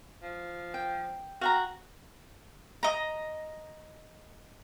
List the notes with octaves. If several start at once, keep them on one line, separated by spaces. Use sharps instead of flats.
F3
G5
F#4 F5 G5 A#5
D#5 A#5